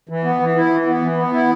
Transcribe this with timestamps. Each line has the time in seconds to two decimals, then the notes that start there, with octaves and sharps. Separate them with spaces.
0.09 E3
0.24 B3
0.40 E3
0.56 E4
0.70 E3
0.86 B3
1.02 E3
1.17 B3
1.33 E4